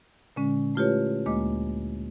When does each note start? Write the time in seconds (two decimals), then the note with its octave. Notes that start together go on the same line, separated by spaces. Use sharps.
0.36 A#2 D3 G#3 C#4
0.75 A3 E4 F4 G4 B4 C#5
1.26 D2 G#3 A#3 D#5 D6